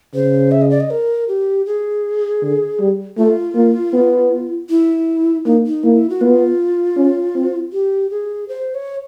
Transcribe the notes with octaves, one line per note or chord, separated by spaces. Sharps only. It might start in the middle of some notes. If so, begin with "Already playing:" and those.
C#3 C5
E5
D#5
D5
D#5
A#4
G4
G#4
D3
G3
A3 F4
A#3
B3
E4
A#3 D#4
D#4
A#3 E4
F#4
B3 F4
C#4
C4
G4
G#4
C5
C#5